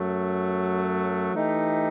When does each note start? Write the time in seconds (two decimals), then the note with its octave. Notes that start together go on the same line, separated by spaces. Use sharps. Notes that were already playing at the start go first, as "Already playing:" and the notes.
Already playing: F#2 F#3 A3
1.33 E3 A3 D#4 G4